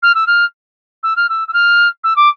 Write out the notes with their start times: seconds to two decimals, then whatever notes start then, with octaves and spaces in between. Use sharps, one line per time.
0.02 F6
0.15 E6
0.27 F6
1.03 E6
1.16 F6
1.29 E6
1.48 E6
1.53 F6
2.04 E6
2.16 D6